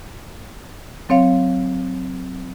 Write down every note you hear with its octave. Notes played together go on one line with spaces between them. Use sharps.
F#3 C4 C#5 F5